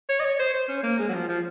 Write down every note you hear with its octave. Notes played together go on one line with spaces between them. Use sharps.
C#5
D#5
C#5
C5
C5
C#4
A#3
G#3
F#3
F3
F3